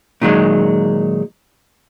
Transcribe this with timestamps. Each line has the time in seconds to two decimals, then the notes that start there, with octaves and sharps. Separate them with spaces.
0.22 A#2 D#3 F#3 G#3